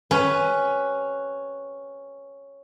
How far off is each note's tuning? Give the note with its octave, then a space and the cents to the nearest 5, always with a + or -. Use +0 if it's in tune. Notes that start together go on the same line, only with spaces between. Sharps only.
C#4 +0 G4 +0 B4 +0